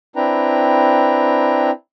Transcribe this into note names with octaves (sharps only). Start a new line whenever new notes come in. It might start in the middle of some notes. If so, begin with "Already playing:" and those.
C4 D4 E4 B4 G5 A#5